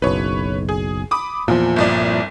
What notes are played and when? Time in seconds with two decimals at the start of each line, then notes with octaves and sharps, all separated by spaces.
0.02 F#1 B1 B4 C#5
0.69 G#4
1.11 B5 D6 D#6
1.48 E2 A#2 F3
1.76 G1 C2 D5